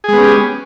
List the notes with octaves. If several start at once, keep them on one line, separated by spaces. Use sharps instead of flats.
G#3 B3 C#4 G4 G#4